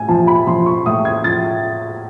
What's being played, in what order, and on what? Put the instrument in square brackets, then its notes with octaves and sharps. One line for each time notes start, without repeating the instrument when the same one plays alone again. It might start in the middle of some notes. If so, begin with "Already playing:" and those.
Already playing: [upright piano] A2 G#5
F3 A5
B5
F3 C6
C#6
A2 D#6
G#6
F3 A6